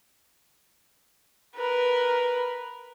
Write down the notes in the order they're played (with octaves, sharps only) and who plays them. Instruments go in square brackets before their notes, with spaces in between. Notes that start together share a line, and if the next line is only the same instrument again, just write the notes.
[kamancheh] A#4 B4